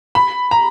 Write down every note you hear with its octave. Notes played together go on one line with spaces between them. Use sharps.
B5
A#5